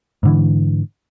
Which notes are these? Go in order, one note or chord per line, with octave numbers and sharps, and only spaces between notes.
G#2 D3 E3